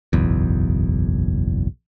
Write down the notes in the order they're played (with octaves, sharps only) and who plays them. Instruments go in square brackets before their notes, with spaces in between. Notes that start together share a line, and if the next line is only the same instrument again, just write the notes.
[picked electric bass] F#1 B1 E2